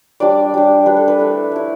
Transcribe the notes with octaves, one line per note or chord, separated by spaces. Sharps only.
G3 D4 D5
G3 D4
G3 D4 B4
A4
B4
A3 C4 E4
A3 E4